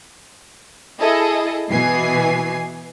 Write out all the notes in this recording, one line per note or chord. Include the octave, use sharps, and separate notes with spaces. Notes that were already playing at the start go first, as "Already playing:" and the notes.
E4 G#4 A4 D#5
B2 E3 B3 G#5 C7